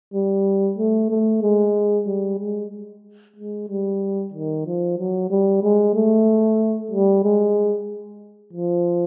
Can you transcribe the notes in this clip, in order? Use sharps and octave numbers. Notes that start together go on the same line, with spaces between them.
G3
A3
A3
G#3
G3
G#3
G#3
G3
D#3
F3
F#3
G3
G#3
A3
G3
G#3
F3